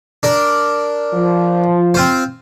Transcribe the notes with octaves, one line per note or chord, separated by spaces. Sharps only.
D4 A#4
F3
C4 F4 C5